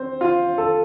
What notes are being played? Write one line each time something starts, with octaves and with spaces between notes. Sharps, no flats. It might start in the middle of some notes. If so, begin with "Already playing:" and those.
Already playing: C4 C5
F4
A4